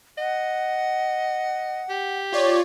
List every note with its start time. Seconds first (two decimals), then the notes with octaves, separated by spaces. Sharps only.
0.18 D#5 F#5
1.89 G4
2.32 F4 C#5 D5